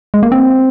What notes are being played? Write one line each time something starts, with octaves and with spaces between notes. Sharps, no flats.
G#3
A#3
C4